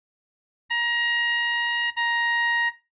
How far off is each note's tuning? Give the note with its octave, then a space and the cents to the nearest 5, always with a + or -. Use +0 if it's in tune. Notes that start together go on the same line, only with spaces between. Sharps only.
A#5 +25
A#5 +15